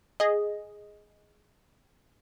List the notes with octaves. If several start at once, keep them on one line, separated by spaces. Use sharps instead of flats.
G#4 D#5